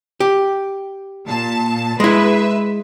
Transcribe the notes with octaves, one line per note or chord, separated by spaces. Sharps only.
G4
A#2 A5
G#3 E4 B4 E5